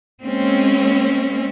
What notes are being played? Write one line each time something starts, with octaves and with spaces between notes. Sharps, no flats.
G#3 A#3 C4 C#4